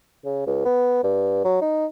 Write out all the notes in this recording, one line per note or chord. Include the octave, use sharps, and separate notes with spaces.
C#3
C#2
B3
G2
F#3
D#4